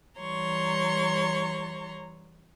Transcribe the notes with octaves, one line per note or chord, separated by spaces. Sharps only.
E3 G3 C#5 A#5 C6 C#6